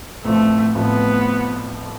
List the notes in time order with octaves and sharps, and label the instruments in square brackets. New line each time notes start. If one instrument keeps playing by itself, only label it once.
[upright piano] A1 A2 F3 C4 [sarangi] A3
[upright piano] A1 A2 F3 C4 [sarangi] B3